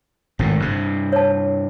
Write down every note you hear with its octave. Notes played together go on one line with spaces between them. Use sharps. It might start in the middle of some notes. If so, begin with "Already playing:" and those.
G#1 A2
G2 C3
C#5 A5